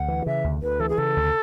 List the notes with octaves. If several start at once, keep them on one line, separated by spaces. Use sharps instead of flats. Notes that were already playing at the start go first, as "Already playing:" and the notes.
Already playing: D2 F#5
E3
C#3 E5
D2
D2 B4
E3 A4
G#4
C#3 A4
D2